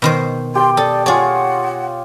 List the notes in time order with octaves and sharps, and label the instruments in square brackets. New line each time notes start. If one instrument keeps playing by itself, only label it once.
[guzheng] B2 D#3 C5
[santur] G4 G5 [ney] C6
[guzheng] A4 [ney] D5 [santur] D#6
[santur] F4 C#5 [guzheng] G#4 D5 [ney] F#5